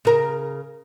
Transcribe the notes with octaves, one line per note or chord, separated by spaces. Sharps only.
C#3 A#4